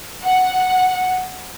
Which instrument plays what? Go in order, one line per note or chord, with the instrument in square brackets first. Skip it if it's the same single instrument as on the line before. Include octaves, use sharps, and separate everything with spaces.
[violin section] F#5